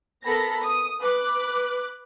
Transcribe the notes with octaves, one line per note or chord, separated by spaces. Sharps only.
B3 A4 A#4 B5 A#6
D#6
B4 D6 F#6